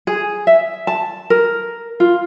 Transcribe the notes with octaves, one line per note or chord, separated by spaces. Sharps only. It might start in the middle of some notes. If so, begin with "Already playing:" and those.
G#4
E5
A5
A#4
F4